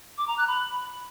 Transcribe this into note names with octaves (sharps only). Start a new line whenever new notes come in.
D6
A#5
F#6
B5